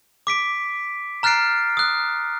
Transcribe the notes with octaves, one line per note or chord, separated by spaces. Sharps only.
D6 B6 D7
A#5 F6 F#6 A6 C7 D7
D#6 F#6